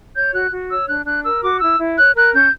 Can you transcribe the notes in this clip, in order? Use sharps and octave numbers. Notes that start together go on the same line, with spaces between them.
C#5 G6
F#4 F#6
F#4
C#5 E6
D4 F#6
D4 F#6
A#4 E6
F#4 D6
E4 E6
E4
C#5 F#6
A#4 F#6
C#4 G6